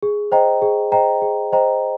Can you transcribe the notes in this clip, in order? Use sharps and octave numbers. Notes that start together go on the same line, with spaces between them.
G#4
C5 D#5 G5 A#5
G#4
C5 D#5 G5 A#5
G#4
C5 D#5 G5 A#5